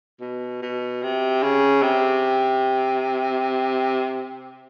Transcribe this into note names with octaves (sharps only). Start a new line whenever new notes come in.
B2
B2
C3
C#3
C3